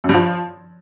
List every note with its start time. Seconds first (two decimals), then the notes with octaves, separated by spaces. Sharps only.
0.04 F#2
0.09 G2
0.14 F3